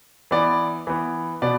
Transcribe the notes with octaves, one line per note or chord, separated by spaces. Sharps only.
E3 B3 D5
E3 B3
B2 B3 D5